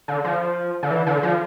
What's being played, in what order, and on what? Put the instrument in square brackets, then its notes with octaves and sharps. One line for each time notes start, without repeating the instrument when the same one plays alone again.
[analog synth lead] D3
F3
D3
E3
D3
F3